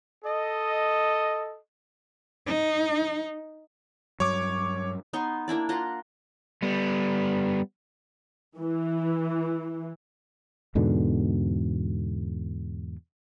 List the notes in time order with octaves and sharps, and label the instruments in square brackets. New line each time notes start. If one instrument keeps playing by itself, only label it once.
[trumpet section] A4 D#5
[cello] D#4
[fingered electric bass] G2 F#3 [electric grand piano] C#5 D6
[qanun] B3 D#4 C6 C#6
A#3 D4 E4 D5
F4 F#5 A#5 C6
[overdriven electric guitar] G3 B3
[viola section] E3
[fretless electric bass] E2 G#2 B2 D3